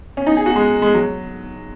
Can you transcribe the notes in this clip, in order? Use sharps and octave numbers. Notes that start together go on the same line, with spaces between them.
C#4
D#4
G#4
F#4
G#3
G#3
F#3